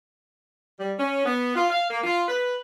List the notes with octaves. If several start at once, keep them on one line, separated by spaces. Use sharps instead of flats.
G3
C#4
B3
F4
F5
A#3
F4
B4